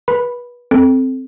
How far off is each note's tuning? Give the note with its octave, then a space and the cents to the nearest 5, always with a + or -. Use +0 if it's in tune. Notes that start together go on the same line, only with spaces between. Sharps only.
B4 -25 B5 +0
C4 -5 A4 -10